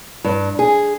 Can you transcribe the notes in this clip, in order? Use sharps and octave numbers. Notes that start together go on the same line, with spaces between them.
G2
G#4